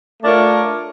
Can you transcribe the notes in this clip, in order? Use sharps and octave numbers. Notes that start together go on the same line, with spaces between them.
A3 D4 F4 A#4 C#5